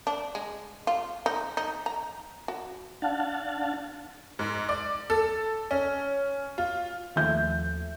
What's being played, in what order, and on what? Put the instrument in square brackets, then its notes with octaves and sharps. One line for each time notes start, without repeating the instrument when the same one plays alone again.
[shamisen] D4
G#3
F4
D#4
D#4
A#5
F#4
[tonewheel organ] D4 F5 F#5 A5
[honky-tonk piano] G#2
D5
A4
C#4
F4
[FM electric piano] D#2 F3 A3 [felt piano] E5 G6